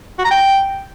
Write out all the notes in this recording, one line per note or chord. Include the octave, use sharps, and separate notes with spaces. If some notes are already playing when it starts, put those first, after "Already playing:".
F#4
A#5
G5